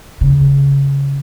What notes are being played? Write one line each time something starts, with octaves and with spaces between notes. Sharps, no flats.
C#3